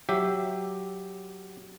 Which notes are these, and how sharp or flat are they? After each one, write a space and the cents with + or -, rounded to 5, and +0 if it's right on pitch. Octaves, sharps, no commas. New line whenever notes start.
F#3 +5 G4 +0 E5 +5